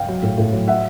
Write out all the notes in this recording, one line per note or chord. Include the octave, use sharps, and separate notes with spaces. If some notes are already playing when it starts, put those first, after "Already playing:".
Already playing: F5 G5
F#3
A2
A2
F#3
E5 F#5